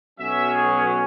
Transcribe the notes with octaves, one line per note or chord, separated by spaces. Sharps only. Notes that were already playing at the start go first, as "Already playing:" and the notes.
B1 B2 F#3 C#4 E5
G#4